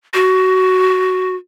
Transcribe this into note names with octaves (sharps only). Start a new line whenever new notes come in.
F#4